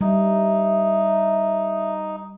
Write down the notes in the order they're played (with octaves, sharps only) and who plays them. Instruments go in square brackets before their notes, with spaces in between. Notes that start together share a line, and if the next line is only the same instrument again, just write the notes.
[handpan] G3 [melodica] D#4 [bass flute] E5